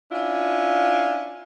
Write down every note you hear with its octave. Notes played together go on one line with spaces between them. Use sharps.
C#4 D4 E4 F4